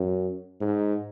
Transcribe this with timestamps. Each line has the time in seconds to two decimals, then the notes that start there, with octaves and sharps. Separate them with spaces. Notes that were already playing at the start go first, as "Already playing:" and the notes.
Already playing: F#2
0.61 G#2